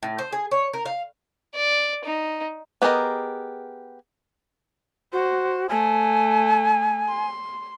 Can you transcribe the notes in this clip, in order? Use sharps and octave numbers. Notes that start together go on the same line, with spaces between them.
A2
C5
G#4
C#5
A#4
F5
D5
D#4
B3 G4 G#4 A#4 D#5
F#4 C5
A3 G#5
C6